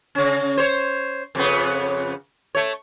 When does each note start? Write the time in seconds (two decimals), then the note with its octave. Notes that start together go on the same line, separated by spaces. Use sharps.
0.15 C#3 C#4
0.58 C5 C#5
1.35 F2 C#3 B3
2.55 A3 C#5